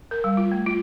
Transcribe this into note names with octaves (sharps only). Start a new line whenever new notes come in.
A#4
G3
F4
A3
F4